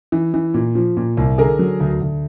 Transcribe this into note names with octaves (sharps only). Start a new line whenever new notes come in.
E3
E3
A#2
F3
A#2
C2
D3 G#4 A#4
F#3
D2
D2